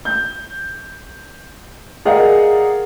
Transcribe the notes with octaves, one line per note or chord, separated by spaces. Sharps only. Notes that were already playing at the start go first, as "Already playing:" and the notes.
G6
G#4 A#4 D5 D#5 F5 F#5